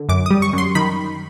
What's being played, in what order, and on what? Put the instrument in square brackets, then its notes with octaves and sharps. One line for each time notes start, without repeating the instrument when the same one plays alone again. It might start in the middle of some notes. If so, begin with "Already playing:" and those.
Already playing: [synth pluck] D3
F#2 D6
G3 D#6
C#6
F#2 C6
D#3 B5